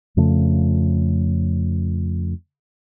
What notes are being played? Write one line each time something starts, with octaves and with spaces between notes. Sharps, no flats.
F2 C#3 F3 A3